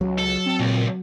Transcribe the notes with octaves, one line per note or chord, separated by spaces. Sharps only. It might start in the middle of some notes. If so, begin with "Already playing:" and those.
C#2 F#3
A4
C4
C#2 A#2